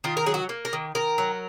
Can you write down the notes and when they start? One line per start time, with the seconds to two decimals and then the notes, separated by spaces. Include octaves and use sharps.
0.04 D#3 F4
0.17 A#4
0.26 F#3 G#4
0.34 F#4
0.49 A#3
0.65 A#4
0.73 D#3
0.95 D#3 A#4
1.18 F#3